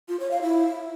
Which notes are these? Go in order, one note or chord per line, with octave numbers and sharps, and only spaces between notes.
F4
C#5
F5
E4